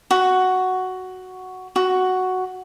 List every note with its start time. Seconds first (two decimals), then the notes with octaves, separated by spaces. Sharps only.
0.11 F#4
1.76 F#4